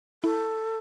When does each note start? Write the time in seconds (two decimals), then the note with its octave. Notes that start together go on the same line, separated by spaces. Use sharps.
0.24 E4 A4